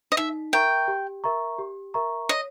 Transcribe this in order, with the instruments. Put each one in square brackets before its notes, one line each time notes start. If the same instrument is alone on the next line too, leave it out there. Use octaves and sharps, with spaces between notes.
[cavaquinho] D#5
[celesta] D#4 [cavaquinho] E5
[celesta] A#4 E5 A#5 C#6 [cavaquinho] G5
[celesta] G4
A#4 E5 A#5 C#6
G4
A#4 E5 A#5 C#6
[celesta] C#5 [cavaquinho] D#5